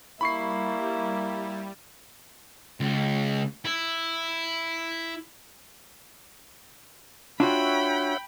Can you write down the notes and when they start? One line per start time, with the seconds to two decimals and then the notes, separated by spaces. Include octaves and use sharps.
0.21 G3 A#3 E4 B5 C#6 C7
2.80 C#2
3.65 E4
7.40 D4 F4 F#4 C#5 E5 F#5 G5 B5